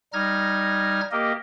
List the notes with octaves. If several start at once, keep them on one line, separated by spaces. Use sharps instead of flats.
G3 D#4 F6 G#6 A#6
A#3 G4 A#4 D#5